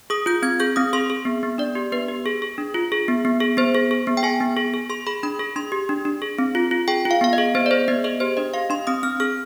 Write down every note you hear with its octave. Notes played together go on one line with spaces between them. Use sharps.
G#4 D#6
F4 G6
C4 G#6
G#4 G6
C4 D#6
G#4 C6
G#4
B3
B3
D4 D5
G4
B3 B4
G4
G#4
G#4
D4
F4
G#4
B3
B3
G#4
B3 C5
G#4
G#4
B3
G5
G#4 G#5
B3
G#4
G#4
G#4 C6
G#4 B5
D4 B5
G#4
D4 C6
G4
D4
D4
G#4
C4
F4
F4
G#4 G5
F4
F5
B3 F5
D#5
G#4
B3 C5
D5
G#4 C5
B3 D#5
G#4 D#5
G4 C5
D4 D#5
G4 F5
D4 C6
C4 D#6
C4 F6
G#4 F6